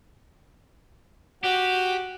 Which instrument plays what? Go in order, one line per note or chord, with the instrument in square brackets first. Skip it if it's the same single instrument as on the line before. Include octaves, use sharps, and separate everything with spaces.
[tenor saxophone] F#4 [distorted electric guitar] G4